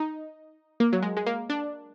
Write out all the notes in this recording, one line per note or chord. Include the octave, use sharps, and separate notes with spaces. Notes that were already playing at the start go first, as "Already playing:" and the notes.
Already playing: D#4
A#3
F#3
G#3
G#3
A#3
D4